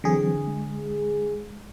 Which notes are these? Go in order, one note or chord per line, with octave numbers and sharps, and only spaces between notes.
D3 E3 F#3 C4 G#4
G#3